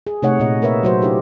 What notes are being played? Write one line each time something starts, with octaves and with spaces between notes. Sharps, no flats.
G#4
C3 A3 D#4 C#5 D#5 F#5
A#2 D#5
A#3 A#4 B4 C#5 E5
F#3 F#4 C5
D4 E4 G4 A4